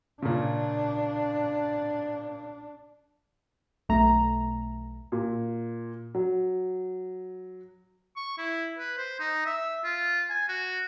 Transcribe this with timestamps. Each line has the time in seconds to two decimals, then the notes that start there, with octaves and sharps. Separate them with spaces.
0.22 A#2 C#3 D4
3.89 B1 A3 A#5
5.12 A#2
6.15 F#3
8.17 C#6
8.38 E4
8.79 B4
8.98 C5
9.20 D#4
9.46 E5
9.84 F4
10.30 G#5
10.49 F#4